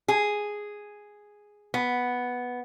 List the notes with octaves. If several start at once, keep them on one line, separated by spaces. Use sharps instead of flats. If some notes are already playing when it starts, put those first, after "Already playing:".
G#4
B3